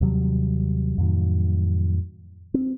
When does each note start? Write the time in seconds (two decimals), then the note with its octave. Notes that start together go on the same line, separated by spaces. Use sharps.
0.01 D#2 C3 F#3 G3
0.98 F2 A2 D#3 F#3
2.54 C4